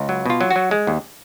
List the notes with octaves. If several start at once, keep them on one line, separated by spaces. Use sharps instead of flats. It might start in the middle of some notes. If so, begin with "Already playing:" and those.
Already playing: C#2
F#3
B2 F4
F#3
F#4
F#3
G#3
D#2